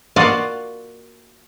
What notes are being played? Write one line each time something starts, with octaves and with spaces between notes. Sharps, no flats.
A#3 F4 F#4 D5 D#5 F5